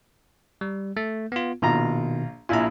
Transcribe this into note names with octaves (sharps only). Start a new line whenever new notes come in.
G3
A3
B3 F4
A#1 B2 D#3 F4 A#5
A#1 E4 F4 G#5 A#5